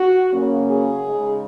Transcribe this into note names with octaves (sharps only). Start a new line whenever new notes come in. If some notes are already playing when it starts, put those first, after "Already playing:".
Already playing: F#4
C#3 F#3 A#3 C#4
G#4
C#3 G#3 D#4